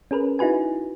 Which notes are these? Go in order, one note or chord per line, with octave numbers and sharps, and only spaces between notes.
C#4 G#4 A#4 B4
D#4 E4 F#4 B4 G#5